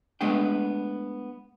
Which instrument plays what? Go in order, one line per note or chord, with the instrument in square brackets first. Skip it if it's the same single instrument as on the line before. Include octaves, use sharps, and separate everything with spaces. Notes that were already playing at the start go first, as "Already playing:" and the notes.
[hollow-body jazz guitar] G#3 A3 B3 D4 G5